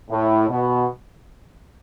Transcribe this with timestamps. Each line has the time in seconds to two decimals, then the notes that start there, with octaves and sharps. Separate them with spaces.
0.11 A2
0.49 B2